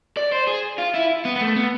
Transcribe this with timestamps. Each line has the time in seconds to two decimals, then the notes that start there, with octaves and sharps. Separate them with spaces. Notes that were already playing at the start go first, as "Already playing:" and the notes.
0.17 D5
0.32 C5
0.47 G#4
0.79 F4
0.94 E4
1.25 B3
1.36 B3
1.41 A3
1.56 B3